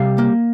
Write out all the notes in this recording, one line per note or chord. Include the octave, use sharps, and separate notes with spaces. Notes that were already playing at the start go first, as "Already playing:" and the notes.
Already playing: C3 G3 F5
A#3